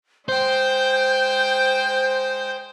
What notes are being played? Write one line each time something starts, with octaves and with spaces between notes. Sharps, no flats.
G#3 C5 G5 G6